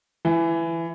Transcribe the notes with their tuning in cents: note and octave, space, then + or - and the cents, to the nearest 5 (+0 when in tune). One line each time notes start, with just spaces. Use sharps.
E3 +15